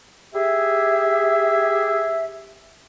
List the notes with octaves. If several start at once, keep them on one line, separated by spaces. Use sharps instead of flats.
G4 G#4 E5